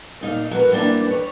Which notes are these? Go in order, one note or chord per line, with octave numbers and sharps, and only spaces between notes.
A#2 D#4 F5
F#3 A#4 B4
E3 F#3 G3 A#3 D4
B4 C#5